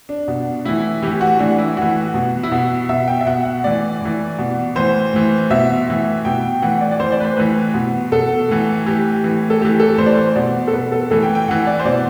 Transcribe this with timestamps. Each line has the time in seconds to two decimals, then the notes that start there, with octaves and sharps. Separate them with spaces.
0.09 D4
0.28 B2
0.65 A2 E3 E4
1.02 A2 E3 G4
1.21 F#4
1.39 A2 E3 D4
1.58 E4
1.77 A2 E3 F#4
2.14 B2
2.43 E4
2.52 B2 F#4
2.89 B2 E5
3.08 G5
3.21 E5
3.26 B2 F#5
3.45 F#5
3.64 A2 E3 D5
4.01 A2 E3
4.38 B2
4.75 A2 E3 C5
5.13 A2 E3
5.50 B2 E5
5.88 A2 E3
6.25 B2 G5
6.62 A2 E3 F#5
6.81 D5
6.91 D5
7.00 A2 E3 C5
7.12 D5
7.20 B4
7.25 C5
7.37 A2 E3 B4
7.74 B2
8.12 B2 A4
8.49 A2 E3
8.86 A2 E3 G4
9.24 A2 E3
9.50 A4
9.61 A2 E3 G4
9.80 A4
9.98 A2 E3 C5
10.06 D5
10.14 C5
10.36 B2 D5
10.67 A4
10.73 B2 B4
10.92 A4
11.10 A2 E3 A4
11.23 G5
11.35 G5
11.48 A2 E3 F#5
11.67 D5
11.79 C5
11.85 B2 D5